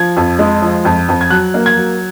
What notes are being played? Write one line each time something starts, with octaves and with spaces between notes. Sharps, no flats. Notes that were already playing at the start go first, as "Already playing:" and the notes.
Already playing: F3 G#6
F2
G#3
F3
F2
F2
G#6
F#3 F#6
A#3
G#6
F#3